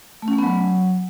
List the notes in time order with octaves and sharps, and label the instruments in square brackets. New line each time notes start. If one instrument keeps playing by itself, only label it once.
[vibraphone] A3
C#4
A3
B3
F#3